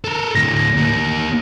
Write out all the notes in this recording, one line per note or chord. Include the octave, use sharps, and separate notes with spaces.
A4 A#4
D2 A2 A#6
A#3 G4